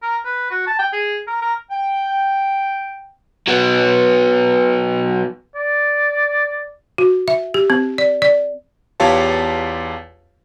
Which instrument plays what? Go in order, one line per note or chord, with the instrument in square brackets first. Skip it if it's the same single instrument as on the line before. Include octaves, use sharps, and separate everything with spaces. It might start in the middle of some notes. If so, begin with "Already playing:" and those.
[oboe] A#4
B4
F#4
A5
G5
G#4
A#4
A#4
[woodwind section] G5
[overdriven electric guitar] F#3 B3
[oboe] D5
[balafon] F#4
E5
G4
C4
D5
D5
[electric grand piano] E2 F4 G4 C#5 F5 A5